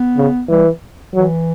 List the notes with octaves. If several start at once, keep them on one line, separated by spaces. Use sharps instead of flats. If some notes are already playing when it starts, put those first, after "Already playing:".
Already playing: B3
C#3
E3 G3
E3 F#3